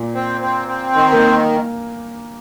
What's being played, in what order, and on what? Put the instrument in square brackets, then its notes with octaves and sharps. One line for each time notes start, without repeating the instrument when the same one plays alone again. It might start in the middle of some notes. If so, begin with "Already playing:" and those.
Already playing: [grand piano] A#2
[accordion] C4
C4
C4
D#3
[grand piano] A#3